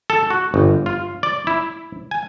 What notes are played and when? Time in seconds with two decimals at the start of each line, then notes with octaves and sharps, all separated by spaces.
0.10 A4
0.30 F#4
0.54 G1
0.86 F4
1.23 D5
1.47 E4
2.11 G#5